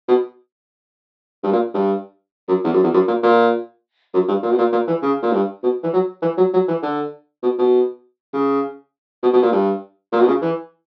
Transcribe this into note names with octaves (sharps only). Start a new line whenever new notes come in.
B2
G2
A#2
G2
F#2
E2
F#2
E2
F#2
A#2
A#2
F#2
G2
A#2
B2
A#2
A#2
E3
C#3
A#2
G2
B2
E3
F#3
E3
F#3
F#3
E3
D3
B2
B2
C#3
B2
B2
A#2
G2
A#2
B2
C#3
E3